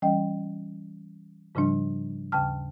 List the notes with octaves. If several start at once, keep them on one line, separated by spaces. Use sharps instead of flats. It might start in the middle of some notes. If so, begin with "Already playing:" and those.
E3 G3 C#4 D#5 G5
G#2 C#3 F3 G3 D4
D#2 C#3 G5 A5 F6